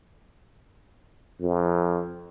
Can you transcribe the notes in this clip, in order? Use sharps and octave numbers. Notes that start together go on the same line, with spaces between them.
F2